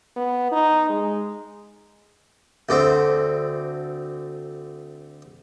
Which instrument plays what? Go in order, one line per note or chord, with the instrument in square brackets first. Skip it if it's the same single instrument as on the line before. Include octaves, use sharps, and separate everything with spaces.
[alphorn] B3
D#4
G#3
[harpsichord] D2 D3 C4